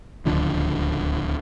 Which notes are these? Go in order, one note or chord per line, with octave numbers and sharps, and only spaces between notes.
D1 C#2 D3 F3